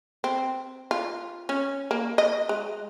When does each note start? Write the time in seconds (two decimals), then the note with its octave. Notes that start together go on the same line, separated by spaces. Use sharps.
0.24 C4
0.91 F4
1.49 C#4
1.91 A#3
2.18 D#5
2.49 G#3